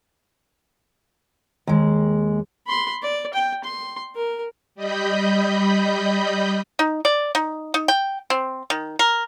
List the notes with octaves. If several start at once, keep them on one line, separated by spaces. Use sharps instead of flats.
D#2 G#3
B5 C6
D5
G5
C6
A#4
G3 D#5 B5 G6
D#4
D5
D#4
D#4
G5
C4
D#3
A#4